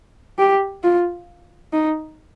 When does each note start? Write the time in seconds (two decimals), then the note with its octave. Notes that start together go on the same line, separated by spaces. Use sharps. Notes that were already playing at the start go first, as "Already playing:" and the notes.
0.39 G4
0.83 F4
1.73 D#4